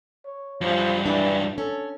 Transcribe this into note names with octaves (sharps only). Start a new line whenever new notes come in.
C#5
F#2 F3 G3
E3 D4
C#4 A4